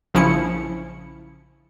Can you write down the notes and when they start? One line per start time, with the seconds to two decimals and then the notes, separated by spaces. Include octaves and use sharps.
0.14 A#1 C#3 F3 C#4 E4 C#7